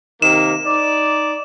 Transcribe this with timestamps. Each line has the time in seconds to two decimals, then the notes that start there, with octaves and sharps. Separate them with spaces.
0.22 C3 D#3 A#3 E7
0.65 D#4 D5